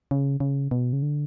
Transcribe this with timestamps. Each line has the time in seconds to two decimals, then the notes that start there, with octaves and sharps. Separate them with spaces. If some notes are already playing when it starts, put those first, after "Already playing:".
0.11 C#3
0.40 C#3
0.71 B2
0.93 C#3
1.02 D3